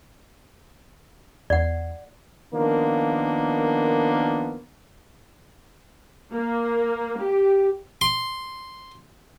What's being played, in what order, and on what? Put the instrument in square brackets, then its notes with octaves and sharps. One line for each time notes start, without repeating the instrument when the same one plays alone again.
[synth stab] E2 [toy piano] D5 F#5
[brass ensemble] D#3 F3 A#3 B3 D4
[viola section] A#3
G4
[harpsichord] C6